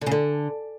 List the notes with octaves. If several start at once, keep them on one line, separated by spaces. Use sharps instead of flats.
D3
C#3
D3